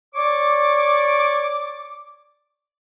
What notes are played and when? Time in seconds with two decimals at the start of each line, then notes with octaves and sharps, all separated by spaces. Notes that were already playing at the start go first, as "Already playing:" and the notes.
0.14 C#5 D5 C#6 D6